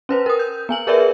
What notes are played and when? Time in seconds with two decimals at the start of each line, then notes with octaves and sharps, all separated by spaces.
0.09 C#4 B4 C5
0.26 A#4 D#6
0.39 G6
0.69 B3 G#5 F#7
0.87 G#4 A#4 B4 D5 E5